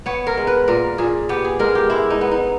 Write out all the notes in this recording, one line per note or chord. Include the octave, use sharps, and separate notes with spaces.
B3 C#5
A#4
G#3
B4
A#2 A#4
A#2 G#4
B3 G4
G#4
G#3 A#4
G4
G#3 E4
D#4
B3
D#4